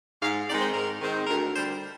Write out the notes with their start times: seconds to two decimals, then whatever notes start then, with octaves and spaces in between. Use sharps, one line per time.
0.21 G#2 F5
0.47 D#3 G#3 C4 D#4 D5
0.61 C5
0.74 G#2 A#4
1.00 D#3 G#3 C4 D#4
1.27 D2 A#4
1.53 D3 C5
1.57 G3